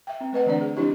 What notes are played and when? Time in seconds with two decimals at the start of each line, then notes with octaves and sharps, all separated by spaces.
0.07 E5 G5
0.21 C4
0.33 A3 B4 D#5 F#5
0.46 D3 E3 A3 C4 D4 D5
0.61 G#4
0.76 F3 C4 D4 E4 G4 D#5